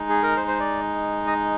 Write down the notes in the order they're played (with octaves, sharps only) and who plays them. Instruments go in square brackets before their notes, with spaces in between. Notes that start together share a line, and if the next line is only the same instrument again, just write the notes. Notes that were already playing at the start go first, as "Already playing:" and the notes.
Already playing: [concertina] G#3 D#4
G#4
A#4
C5
C5
D5
D#5